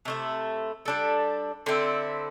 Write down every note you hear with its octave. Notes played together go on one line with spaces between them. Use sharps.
C3 A3 E4
G3 D4 A4
D3 C4 E4